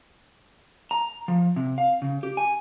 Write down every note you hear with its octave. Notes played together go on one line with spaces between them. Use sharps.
A#5
F3
C3
F5
C#3
G4
G#5